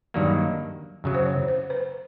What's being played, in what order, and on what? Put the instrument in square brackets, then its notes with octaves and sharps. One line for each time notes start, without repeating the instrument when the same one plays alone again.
[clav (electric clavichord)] G2 D#3 F#3 A#3 [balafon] D5
[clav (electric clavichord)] F#2 C#3 F#3
[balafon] C5
C#5
C5
B4